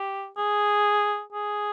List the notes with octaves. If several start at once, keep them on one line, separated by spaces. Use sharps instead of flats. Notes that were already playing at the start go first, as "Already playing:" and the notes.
Already playing: G4
G#4
G#4